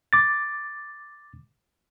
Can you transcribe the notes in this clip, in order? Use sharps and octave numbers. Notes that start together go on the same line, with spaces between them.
D6 A6